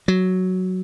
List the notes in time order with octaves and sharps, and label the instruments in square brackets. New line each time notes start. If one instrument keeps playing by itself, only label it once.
[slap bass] F#3